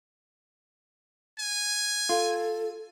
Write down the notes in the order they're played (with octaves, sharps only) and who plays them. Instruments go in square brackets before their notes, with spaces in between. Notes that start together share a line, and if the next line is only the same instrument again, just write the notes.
[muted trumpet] G#5
[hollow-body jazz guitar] F4 [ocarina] A4